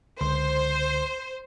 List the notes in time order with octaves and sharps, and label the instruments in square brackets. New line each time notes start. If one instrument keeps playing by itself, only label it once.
[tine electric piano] C#2 D3 C6 [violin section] C5